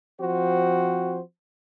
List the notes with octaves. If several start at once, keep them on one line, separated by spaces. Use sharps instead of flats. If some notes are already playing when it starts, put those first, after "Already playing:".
F3 C4 F#4 C5